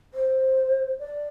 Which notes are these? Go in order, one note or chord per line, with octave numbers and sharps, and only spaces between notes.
C5
D5